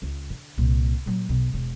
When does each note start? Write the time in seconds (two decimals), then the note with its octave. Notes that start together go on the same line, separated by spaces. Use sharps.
0.02 C#2
0.30 D3
0.58 C2 A#2
1.06 A#2 F#3
1.29 B1
1.54 E1